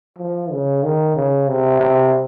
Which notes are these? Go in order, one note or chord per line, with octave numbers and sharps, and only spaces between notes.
F3
C#3
D#3
C#3
C3
C3